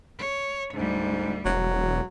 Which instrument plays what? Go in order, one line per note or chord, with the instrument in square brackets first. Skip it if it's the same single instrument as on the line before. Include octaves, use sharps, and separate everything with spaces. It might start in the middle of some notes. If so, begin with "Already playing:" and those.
[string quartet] C#5
[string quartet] D2 G3 [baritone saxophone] G#2
[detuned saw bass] E1 [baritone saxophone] F#3